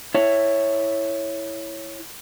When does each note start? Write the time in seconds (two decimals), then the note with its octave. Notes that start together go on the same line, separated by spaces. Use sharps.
0.15 E4 C#5